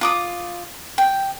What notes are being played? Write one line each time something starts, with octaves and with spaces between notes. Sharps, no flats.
F4 D6 D#6
G5